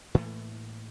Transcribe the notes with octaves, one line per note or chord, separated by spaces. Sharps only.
A2 E3 A3 A#3